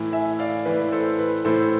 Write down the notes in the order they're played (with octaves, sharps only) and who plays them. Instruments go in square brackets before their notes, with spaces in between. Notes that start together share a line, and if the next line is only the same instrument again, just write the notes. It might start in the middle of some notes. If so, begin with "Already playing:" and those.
Already playing: [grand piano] A2 E3
E5 G#5
D5 F5
A2 E3 B4 D5
A4 C5
B4
A2 E3 A4 C5